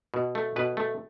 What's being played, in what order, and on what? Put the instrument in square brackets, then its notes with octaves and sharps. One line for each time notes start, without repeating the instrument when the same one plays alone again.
[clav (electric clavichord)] B2
A3
B2 B4
A3